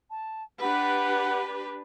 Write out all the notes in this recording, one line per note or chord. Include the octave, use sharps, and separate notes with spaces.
A5
D4 G4 B4 F#5